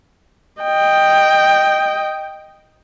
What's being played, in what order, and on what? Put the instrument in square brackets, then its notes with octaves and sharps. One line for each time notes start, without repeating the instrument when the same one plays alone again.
[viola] D#5 G5